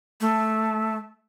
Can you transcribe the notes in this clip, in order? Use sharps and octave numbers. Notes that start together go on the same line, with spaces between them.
A3